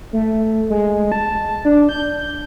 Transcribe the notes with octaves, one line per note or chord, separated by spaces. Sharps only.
A3
G#3
A5
D4
G6